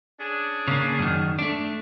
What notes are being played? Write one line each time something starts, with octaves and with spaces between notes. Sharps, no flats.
C#4 D4 G#4
C#3 A#3
F#2 D#3
A3 D4